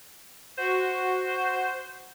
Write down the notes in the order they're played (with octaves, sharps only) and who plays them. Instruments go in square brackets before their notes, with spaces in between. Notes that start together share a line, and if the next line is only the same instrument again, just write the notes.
[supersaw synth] F#4 [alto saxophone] C5